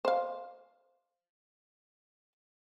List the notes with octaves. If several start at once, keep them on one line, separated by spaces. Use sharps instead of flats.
C5 F5